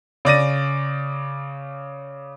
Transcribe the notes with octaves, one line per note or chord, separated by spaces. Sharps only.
C#3 D5 A#6 D#7